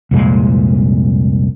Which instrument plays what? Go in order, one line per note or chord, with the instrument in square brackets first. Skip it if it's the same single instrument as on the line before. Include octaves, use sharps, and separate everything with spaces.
[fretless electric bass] C2 F2 A#2 G#3